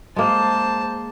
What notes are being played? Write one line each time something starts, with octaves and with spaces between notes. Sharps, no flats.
G#3 A#3 C5 A5